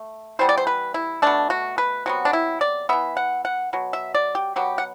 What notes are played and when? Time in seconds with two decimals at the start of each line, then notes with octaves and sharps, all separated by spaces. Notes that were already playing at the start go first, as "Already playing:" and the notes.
Already playing: A3
0.39 E3 G3 B3 C5
0.49 D5
0.57 C5
0.67 B4
0.94 E4
1.22 B2 A3 D4
1.50 F#4
1.78 B4
2.06 C3 F#3 B3 F#4
2.25 D4
2.33 E4
2.61 D5
2.89 E3 B3 E5
3.17 F#5
3.45 F#5
3.73 B2 F#3
3.93 E5
4.15 D5
4.35 G4
4.56 B2 F#3 B3 G4
4.78 F#5